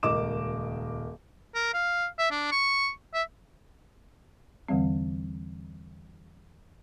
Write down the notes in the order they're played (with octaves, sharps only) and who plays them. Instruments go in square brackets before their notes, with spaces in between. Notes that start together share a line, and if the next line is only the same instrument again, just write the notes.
[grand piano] D#1 C#2 A#4 D#5 D6 E7
[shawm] A#4
F5
E5
D4
C#6
E5
[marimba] E2 D3 E3 G3 C4